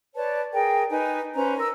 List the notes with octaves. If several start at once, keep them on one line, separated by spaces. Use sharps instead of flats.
B4 C#5 D5 A5
G#4 A#4 G5
D#4 B4 G#5
C#4 B4 C5 A#5
A#4 E6